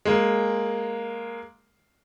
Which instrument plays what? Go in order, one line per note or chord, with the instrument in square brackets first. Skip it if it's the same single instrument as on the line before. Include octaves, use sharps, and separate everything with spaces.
[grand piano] G#3 A#3